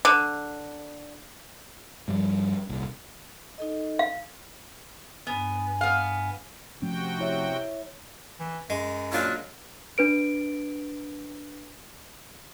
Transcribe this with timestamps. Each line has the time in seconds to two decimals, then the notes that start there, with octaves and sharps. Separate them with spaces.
0.05 D3
2.08 G2 F3 G3
2.69 D#1 C2
3.58 D#4 A4 D#5
3.99 F5
5.27 G2 B3 G#5
5.81 B3 F5
6.82 C3 F3 A3 C#4 F#4 G5
7.19 E4 C#5 E5
8.40 E3
8.70 F#2 G#3
9.12 A#2 F#3 D4 F4
9.98 D4 B4 D7